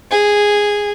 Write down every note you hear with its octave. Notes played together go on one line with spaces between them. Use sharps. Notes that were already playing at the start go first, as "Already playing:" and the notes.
G#4